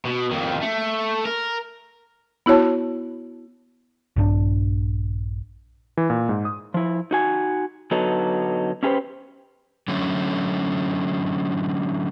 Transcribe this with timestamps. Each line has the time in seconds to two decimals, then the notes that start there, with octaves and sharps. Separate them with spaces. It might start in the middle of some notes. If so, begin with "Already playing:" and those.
0.05 B2
0.31 F2 D#3
0.61 A3
1.25 A#4
2.46 B3 E4 F#4 C#5 A5
4.16 A#1 G2 D4
5.97 E3
6.10 A#2
6.29 G#2
6.45 D#6
6.74 F3 E4
7.11 D#4 F#4 G#5
7.91 D3 F#3 B3 D#4 F#4 A4
8.83 C#4 E4 G4 A4 B4 C5
9.88 D3 F#3 A3 C#4